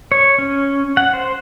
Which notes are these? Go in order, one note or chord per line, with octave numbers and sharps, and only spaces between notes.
C#5
C#4
F#5
C5